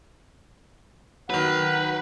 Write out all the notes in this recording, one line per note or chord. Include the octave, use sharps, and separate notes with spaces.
D#3 F#3 B4 F#5